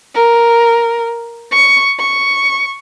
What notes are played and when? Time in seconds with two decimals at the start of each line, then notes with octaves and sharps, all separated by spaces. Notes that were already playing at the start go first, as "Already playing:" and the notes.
0.15 A#4
1.52 C#6
1.99 C#6